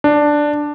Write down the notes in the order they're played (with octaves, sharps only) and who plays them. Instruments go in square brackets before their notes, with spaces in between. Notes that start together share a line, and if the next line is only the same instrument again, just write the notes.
[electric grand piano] D4